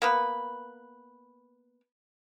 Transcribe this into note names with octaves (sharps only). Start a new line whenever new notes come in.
A#3 B3 B4